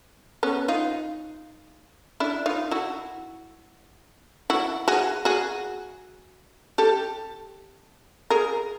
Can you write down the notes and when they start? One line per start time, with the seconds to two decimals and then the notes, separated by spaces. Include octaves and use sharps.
0.43 B3 C#4
0.68 D#4 F4
2.20 D4 E4
2.46 D#4 F4
2.71 E4 F#4
4.50 E4 F#4
4.88 F#4 G#4
5.25 F#4 G#4
6.78 G4 A4
8.30 G#4 A#4